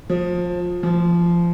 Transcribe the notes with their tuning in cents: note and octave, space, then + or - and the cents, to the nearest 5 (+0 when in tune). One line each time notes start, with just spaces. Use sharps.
F3 +20
F3 -20